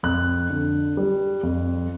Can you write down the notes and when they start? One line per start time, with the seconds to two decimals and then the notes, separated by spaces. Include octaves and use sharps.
0.03 F2 F#6
0.50 D3
0.97 G3
1.43 F2